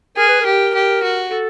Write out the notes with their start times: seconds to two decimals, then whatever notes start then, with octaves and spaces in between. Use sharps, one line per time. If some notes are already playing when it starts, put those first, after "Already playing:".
0.17 G#4 A#4
0.29 B4
0.42 G4 A#4
0.74 G4
1.03 F#4
1.31 A4